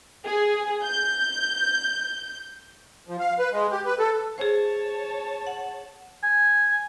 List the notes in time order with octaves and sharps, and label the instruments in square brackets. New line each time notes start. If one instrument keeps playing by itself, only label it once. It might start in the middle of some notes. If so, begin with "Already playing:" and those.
[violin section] G#4
G6
[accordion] F3
F5
B4
G#3
G4
B4
A4
[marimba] G#4 C5 [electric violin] C#5 A5
[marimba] F#5
[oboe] G#5